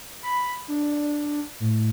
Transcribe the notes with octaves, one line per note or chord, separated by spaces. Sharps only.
B5
D4
A2